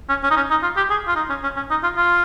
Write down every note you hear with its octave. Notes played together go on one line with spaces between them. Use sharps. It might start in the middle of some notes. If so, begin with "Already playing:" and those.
C#4
C#4
D#4
C#4
D#4
F4
G4
G#4
F4
D#4
C#4
C#4
C#4
D#4
F4
F4